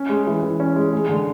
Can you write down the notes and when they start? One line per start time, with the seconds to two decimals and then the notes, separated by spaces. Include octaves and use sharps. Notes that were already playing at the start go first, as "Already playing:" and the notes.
Already playing: C#4
0.09 G#3
0.27 E3
0.43 E3
0.60 C#4
0.76 G#3
0.93 G#3
1.09 D3